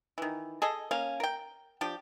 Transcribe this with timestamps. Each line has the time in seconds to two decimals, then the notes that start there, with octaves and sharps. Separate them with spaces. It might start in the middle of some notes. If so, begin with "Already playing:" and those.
0.18 D#3 E3
0.62 G#4 A4 D#5
0.91 A#3 C#4 F5
1.20 A#4 G5
1.81 F3 D4 G4